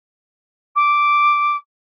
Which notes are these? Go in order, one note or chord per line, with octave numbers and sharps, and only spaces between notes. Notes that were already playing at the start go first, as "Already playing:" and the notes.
D6